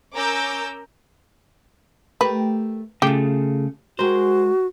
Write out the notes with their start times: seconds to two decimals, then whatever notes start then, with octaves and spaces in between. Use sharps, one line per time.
0.14 C#4 A#4 A#5 D6 E6 G6
2.21 A3 G4 A#4 B4
3.02 C#3 A3 F4 G4 G#4
3.99 G#3 F#4 A#4 C5